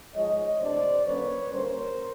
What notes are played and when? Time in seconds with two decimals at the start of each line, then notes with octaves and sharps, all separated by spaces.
0.14 G#2 F3 G#3 C#5 D#5
0.59 C3 E3 A3 D4 C5 D5
1.05 D3 F#3 A#3 C#4 B4 C#5
1.50 D3 G3 A#3 C#4 A#4 C5